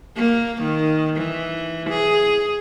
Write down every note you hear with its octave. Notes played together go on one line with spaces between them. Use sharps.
A#3
D#3
E3
G#4